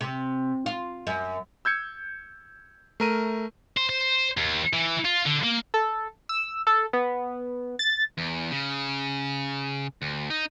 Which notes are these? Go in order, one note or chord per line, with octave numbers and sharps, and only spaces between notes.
C3
F4
F#2
E6 G6 G#6 C#7
A3 A#4 D#7
C5
C5
D#2
E3
F4
D3
A#3
A4
E6
A4
B3
A6
E2
C#3
D2
D#4